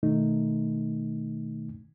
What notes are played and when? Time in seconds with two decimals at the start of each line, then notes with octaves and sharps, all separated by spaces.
0.03 B2 D#3 A3 D#4